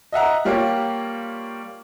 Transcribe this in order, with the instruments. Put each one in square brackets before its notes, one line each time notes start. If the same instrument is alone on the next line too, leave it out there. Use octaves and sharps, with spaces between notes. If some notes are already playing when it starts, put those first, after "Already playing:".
[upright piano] D#5 E5 F#5 A#5
G3 A#3 F4 G4 C#5